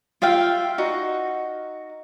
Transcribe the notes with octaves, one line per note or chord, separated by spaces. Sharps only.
F4 E5 F5 G5
D#4 F#4